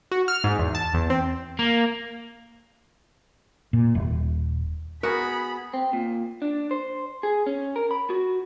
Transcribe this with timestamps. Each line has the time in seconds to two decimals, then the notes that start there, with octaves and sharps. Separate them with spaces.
0.12 F#4
0.28 F6
0.44 G#2
0.59 E2
0.75 A5
0.94 E2
1.10 C4
1.59 A#3
3.73 A#2
3.95 D#1
5.03 B3 F#4 G#4 A#4 B5
5.74 C4
5.93 A#2
6.42 D4
6.71 C5
7.23 G#4
7.46 C#4
7.76 A#4
7.91 B5
8.10 F#4